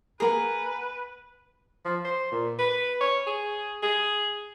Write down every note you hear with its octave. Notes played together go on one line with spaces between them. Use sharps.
A#3 G#4 A#4 B4 F#5 G#5
F3
C5
A#2
B4
C#5
G#4
G#4